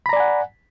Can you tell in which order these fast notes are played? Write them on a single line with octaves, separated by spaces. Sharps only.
B5 A#5 D5 G#5 F#5